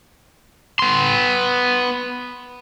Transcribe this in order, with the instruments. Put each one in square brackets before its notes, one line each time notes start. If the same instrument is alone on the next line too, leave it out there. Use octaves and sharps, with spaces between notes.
[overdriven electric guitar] B3 C6